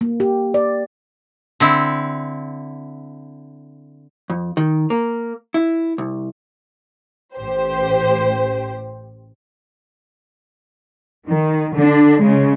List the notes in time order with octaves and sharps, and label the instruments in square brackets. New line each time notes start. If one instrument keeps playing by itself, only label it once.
[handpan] A#3
G4
D5
[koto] D3 C4 E4
[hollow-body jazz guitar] F2
D#3
A#3
E4
C2
[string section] A1 G4 C5
[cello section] D#3
D3 D4
C#3 G#3